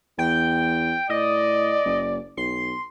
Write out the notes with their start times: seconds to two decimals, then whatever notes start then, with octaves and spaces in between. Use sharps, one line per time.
0.19 E2 G5
1.10 A2 D5 D#5
1.85 F#1
2.37 B1 C6